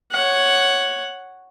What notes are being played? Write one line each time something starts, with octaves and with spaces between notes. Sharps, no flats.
C#5 F#5